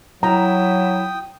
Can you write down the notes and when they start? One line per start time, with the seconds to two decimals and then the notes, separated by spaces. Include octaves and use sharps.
0.23 F#3 E4 G5 A#5 D#6